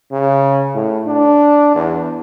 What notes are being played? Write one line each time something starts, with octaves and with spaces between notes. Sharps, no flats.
C#3
A2
D4
E2